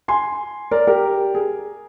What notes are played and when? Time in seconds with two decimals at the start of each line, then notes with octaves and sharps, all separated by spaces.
0.08 G#5 C6
0.71 A#4 D5
0.87 G4 A#4
1.35 G#4